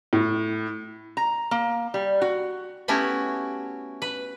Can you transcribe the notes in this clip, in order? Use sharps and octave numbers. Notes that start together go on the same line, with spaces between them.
A2
A#5
A#3
G3
F#4
A3 B3 C#4 E4 F#4 G4
B4